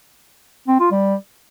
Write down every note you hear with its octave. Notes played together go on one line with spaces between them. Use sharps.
C4
F4
G3